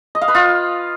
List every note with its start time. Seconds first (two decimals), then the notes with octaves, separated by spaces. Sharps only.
0.15 D#5
0.21 F5
0.28 B4
0.35 F4